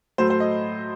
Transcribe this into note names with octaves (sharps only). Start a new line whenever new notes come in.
A2 F#3 A3 C5
C5
D#5